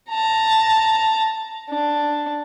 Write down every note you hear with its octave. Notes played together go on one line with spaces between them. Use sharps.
A5 A#5
D4